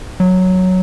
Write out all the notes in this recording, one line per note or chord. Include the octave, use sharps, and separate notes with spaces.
F#3